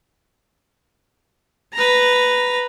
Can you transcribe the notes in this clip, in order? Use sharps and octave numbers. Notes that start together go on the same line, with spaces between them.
B4 A#5